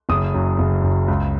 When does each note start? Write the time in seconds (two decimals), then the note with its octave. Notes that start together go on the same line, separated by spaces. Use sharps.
0.09 F#1 D#6
0.34 F#2
0.59 F#1
0.83 F#2
1.08 C#2